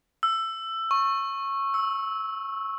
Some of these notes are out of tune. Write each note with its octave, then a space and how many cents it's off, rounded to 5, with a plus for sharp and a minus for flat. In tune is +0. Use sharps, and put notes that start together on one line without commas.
E6 +15
C#6 -15
E6 -15